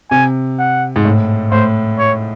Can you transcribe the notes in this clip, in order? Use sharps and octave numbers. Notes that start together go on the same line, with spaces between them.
C3 G#5
F#5
G#2
A2
A2 C5
C#5